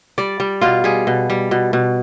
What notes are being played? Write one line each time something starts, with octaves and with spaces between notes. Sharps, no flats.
G3 D5
G3
B2 F4
G3 G#4
B2
G3
B2
B2